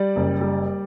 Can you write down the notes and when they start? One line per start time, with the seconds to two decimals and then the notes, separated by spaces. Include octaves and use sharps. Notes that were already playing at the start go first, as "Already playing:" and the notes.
Already playing: G3 D5
0.16 F#1
0.41 G3